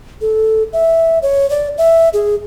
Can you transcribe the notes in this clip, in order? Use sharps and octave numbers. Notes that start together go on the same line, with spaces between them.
A4
E5
C#5
D5
E5
G#4